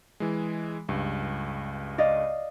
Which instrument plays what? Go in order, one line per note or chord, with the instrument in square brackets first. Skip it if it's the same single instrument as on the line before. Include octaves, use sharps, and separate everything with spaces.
[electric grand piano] E3 G#3
C#2 G2
[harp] D5 D#5 F5